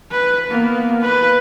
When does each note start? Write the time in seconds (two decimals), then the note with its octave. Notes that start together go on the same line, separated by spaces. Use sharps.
0.11 B4
0.50 A#3 B3
1.01 B4